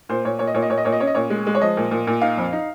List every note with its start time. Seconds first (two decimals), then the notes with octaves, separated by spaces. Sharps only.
0.09 A#2 C5
0.25 A#2 C#5
0.39 A#2 C#5
0.47 D#5
0.54 A#2 C#5
0.62 D#5
0.70 A#2 C#5
0.78 D#5
0.85 A#2 C#5
0.92 D#5
1.00 C#4 C#5
1.07 D#5
1.15 A#2 C#5
1.30 G#3
1.47 G#3
1.55 C#5
1.61 F3 D#5
1.77 A#2
1.91 A#2
2.07 A#2
2.21 D#4 F5
2.37 F2
2.53 D#4